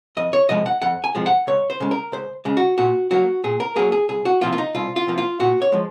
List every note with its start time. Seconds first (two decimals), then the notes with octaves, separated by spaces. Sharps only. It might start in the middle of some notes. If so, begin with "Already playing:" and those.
0.17 F2 D#5
0.33 C#5
0.49 C3 F3 G#3 D#5
0.66 F#5
0.82 F2 F#5
1.04 G#5
1.15 C3 F3 G#3
1.26 F#5
1.47 C#2 C#5
1.70 C5
1.80 C#3 G#3
1.91 A#4
2.12 C#2 C5
2.45 C#3 G#3
2.57 F#4
2.78 A#2 F#4
3.11 F#3 A#3 F#4
3.44 A#2 G#4
3.60 A#4
3.76 F#3 A#3 G#4
3.92 G#4
4.09 C2 G#4
4.25 F#4
4.41 C3 F3 A#3 F4
4.53 F4
4.58 D#4
4.75 C2 F4
4.96 F4
5.07 C3 F3 A#3
5.18 F4
5.40 A#2 F#4
5.62 C#5
5.72 F3 G#3